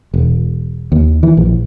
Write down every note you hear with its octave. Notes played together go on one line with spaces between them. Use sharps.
E1
D#2
E3
A#1